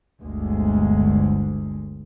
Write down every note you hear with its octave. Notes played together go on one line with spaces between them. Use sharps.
G1 D2 G#3